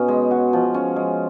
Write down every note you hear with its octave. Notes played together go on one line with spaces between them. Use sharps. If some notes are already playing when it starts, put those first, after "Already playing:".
Already playing: B2 C#4
G#3
F#4
F3
C#4
G#3